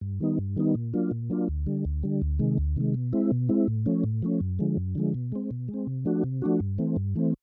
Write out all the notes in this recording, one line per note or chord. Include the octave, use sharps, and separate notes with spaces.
G2
D#3 G3 B3 D#4
G2
D#3 G3 B3 D#4
A#2
F#3 A#3 D4 F4
A#2
F#3 A#3 D4 F4
D2
D3 G3
D2
D3 G3
D2
C3 D#3 G#3
D2
C3 D#3 G#3
B2
G#3 C4 E4
B2
G#3 C4 E4
A2
F3 A3 C#4
A2
F3 A3 C#4
F#2
D3 F3 G#3
F#2
D3 F3 G#3
B2
G#3 C4
B2
G#3
C4
C3
F3 A3 D4 F#4
C3
F3 A3 D4 F#4
G2
E3 A3 C4
G2
E3 A3 C4